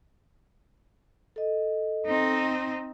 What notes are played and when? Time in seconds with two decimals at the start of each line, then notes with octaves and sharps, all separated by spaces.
1.36 A4 D#5
2.06 C4 D#4